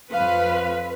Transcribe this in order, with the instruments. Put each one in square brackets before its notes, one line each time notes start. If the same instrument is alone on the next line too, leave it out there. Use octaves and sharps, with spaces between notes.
[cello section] F2 B4 [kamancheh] F5